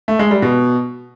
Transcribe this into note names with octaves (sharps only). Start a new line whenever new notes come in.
A3
G#3
G3
B2